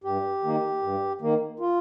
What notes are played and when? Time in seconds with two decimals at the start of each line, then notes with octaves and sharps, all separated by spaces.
0.04 G2 G4
0.43 D#3 A#3
0.82 G2
1.21 D#3 A#3
1.60 F4